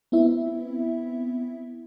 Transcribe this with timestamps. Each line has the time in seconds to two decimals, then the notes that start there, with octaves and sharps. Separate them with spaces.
0.12 B3 C4 E4 E5